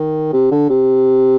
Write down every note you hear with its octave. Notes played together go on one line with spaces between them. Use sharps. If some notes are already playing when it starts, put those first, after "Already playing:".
Already playing: D#3
C3
D3
C3